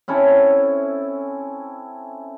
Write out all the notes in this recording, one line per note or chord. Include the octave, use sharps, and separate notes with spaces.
C4 C#4 E4 A4